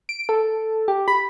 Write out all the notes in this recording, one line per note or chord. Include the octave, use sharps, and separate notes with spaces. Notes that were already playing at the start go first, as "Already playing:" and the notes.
D7
A4
G4
B5